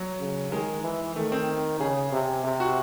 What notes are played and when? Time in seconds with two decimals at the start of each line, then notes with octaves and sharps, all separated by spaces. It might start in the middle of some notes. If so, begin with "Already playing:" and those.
Already playing: F#3
0.19 C#3
0.51 D#3 G#3
0.83 E3
1.16 D#3 A3
1.32 C4
1.80 C#3 G#4
2.12 C3
2.44 C3
2.60 F#4